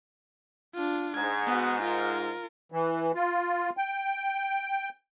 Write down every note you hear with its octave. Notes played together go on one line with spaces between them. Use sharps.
D4 F4
G#2 G#6
B3 F#4
F4 A#4
E3
F4
G5